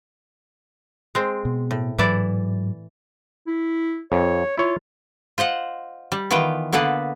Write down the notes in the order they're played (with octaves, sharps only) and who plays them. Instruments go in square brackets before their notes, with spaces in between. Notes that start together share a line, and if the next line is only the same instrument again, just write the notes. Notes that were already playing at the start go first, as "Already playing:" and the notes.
[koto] G#3 C4
[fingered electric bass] B2
[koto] A2
[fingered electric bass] G#2 F#3 [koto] E3 E4 D5
[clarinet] E4
[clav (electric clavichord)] F2 [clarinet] C#5
[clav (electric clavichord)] E4 C#5 [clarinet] F4
[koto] F4 C5 D#5 F#5
G3
D#3 E3 B3 F4 G5
D3 A#3 B3 A4 B4